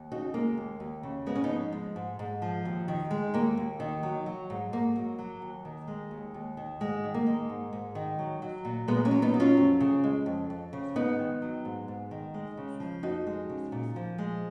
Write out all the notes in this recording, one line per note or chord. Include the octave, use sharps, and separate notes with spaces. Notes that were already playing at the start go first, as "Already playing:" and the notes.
Already playing: D#2
C#3 D#4 F#4
G#3 A#3
D#2
D#2
C#3
G#2 G#3 B3
C#4
B3 D#4
F3
G#3
G#2
G#2
F3
D#2
D#3
G#3
D#2 A#3
D#2
D#3
F#3
F#3
G#2
G#2 A#3
F#3
F#3
D#2
D#3
G#3
D#2
D#2
D#3
G#2 G#3
D#3
A#3
G#3
G#2
G#2
D#3
F#3
F#3
A#2
A#2 G#3 B3
A#3 C#4
F#3
B3 D#4
F#3
C#4 F4
F2
C#3
G#3
F2
F2
C#3
G#2 B3 D#4
D#3
F#3
G#2
G#2
D#3
G#3
C#3
F3
F2 D#4 F#4
G#3
C#3
A#2
F3
G#3